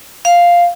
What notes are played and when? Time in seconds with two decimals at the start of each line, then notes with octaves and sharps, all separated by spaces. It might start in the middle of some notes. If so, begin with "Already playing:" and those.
0.25 F5